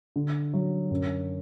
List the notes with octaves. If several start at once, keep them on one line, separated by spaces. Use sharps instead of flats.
D3
F#3
F#2